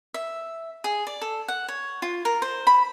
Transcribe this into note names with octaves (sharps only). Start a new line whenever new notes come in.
E5
G#4
D5
A4
F#5
C#5
F4
A#4
C5
B5